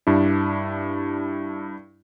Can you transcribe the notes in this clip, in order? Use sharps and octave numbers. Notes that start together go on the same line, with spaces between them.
G2 D4 E4